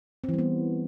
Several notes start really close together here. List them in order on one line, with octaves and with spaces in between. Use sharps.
C4 E3 G3 B3